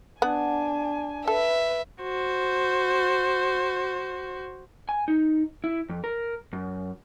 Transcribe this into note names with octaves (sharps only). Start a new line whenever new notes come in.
B3 D4 F#5 G#5
A4 B4 E5
F#4 C5
G#5
D#4
E4
F2
A#4
F#2